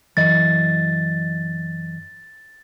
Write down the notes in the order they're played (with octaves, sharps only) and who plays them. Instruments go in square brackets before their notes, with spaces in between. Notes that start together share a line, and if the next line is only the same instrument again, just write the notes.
[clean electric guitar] F#2 E3 D#5 [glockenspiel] A6